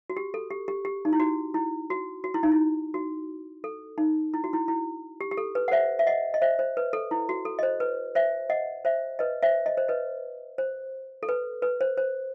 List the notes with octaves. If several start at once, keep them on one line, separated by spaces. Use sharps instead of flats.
F#4
G4
A4
G4
G4
G4
D#4
E4
F#4
E4
F#4
F#4
E4
D#4
E4
F#4
A4
D#4
E4
F#4
E4
E4
G4
G4
A4
B4
F#5
C5 E5
E5
D#5 F#5
D#5
C5 E5
C5
B4
A4
E4
F#4
A4
D#5
C5
B4
C5 E5
D#5 F#5
C5 E5
B4 D#5
C5 E5
D#5
C5
B4 D#5
C5
A4
B4
B4
C5
C5